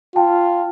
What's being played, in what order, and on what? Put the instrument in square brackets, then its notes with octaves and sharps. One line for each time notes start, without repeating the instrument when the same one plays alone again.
[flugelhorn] F4 [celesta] G5 A5